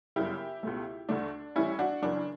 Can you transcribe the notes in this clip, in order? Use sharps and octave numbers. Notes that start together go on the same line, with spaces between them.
G1 F#2 C#3 G3 E4 G4
C#2 B2 A3
D2 D3 A3 D4
A1 A2 E3 G3 C#4 E4
D4 F#4
F#1 F#2 C#3 E3 D4